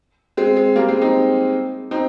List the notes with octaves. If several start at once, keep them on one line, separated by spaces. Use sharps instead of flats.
G#3 C4
G#3
G3 A#3
G#3 C4
C4 D#4
C4 D#4